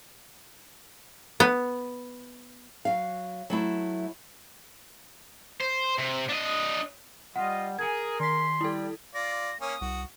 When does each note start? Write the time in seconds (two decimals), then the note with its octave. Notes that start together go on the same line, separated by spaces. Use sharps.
1.40 B3
2.85 F#3 F5
3.50 F#3 A3 E4
5.61 C5
5.98 C3
6.29 D4 D#5
7.36 G3 F4 D#5 F#5
7.79 G#4 A#4 G#5 G#6
8.20 D#3 C6 B6
8.61 G3 E4 A4
9.15 F4 D5 A#6
9.61 A#3 C#4 D#6
9.81 C2 F#4